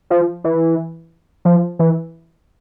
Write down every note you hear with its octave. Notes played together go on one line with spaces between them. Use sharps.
F3
E3
F3
E3